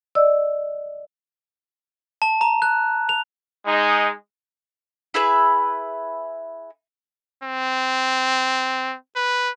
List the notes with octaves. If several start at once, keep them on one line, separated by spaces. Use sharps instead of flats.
D5 D#5 E6
A5
A#5
F#6
F7
G#3 D#4
E4 G#4 B4 E5
C4
B4